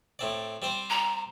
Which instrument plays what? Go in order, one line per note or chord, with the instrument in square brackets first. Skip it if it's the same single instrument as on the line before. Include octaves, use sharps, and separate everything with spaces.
[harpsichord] A2 C4 D5
G3 C4 C5
[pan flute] A#5